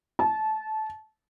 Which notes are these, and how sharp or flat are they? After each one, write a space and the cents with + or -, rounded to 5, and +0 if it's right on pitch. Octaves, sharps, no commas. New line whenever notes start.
A5 -20